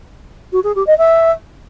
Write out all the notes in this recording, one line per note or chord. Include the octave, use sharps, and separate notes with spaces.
F#4
G#4
G4
D#5
E5